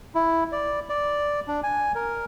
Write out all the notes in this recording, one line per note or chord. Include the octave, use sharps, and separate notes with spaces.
E4
D5
D5
D4
G#5
A#4